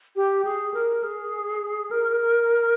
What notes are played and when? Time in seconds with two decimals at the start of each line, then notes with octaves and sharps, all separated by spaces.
0.16 G4
0.45 G#4
0.74 A#4
1.04 G#4
1.91 A#4